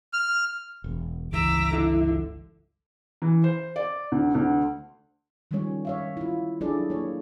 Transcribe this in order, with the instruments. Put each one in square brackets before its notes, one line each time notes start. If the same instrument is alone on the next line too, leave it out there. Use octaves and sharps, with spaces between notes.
[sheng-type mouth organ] F6
[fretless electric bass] E1
[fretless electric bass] G1 C#2 E3 [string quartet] E5 A#5 D6
[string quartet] D3 [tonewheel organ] E4
[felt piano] E3
C5
D5
D2
D2
[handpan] D#3 F3 G3 G#3 C#4 C#5
C#5 E5 F5
E4 F4
F#3 D4 E4 G#4 A4 D5
A#3 C#5